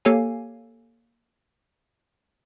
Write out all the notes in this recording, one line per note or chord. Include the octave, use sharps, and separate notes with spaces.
A#3 G4 A4 C#5 F5 G#5